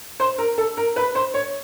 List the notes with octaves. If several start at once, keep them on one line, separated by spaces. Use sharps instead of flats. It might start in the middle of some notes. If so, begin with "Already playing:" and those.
C5
A#4
A4
A#4
B4
C5
C#5